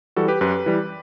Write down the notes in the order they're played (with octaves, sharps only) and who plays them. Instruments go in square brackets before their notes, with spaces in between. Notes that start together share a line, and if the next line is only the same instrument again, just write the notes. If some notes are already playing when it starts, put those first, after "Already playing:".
[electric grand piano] E3 G3 F#4 A4
G4 B4
F#2 G4 B4
E3 G3